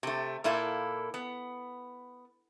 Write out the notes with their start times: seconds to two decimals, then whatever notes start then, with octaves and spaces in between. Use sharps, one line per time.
0.03 C3 A3
0.44 A#2 A#3 E4 A4
1.14 B3